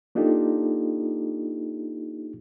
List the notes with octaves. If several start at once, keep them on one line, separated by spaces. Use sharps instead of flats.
A#3 D4 D#4 F4 G4 A4